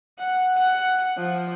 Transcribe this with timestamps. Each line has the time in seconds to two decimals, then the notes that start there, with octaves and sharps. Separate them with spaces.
0.18 F#5
0.58 F#5
1.17 F3